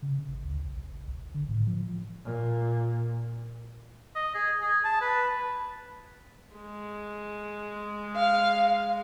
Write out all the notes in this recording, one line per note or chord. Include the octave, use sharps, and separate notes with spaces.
C#3
G#1
D2
B1
F#1
C2
F#1
D3
A2
F3
A#2
D#5
G#4
G#4
A5
B4
G#3
F5